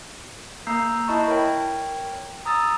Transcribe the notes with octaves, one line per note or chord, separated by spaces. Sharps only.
A#3 A#5 E6 G6 C7
E4 D#5 A5 B5 C#6 G6
A#4 C#5 G5
A#5 D#6 E6 A6